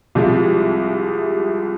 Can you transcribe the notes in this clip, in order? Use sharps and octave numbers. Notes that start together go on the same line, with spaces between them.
C2 C3 F3 G#3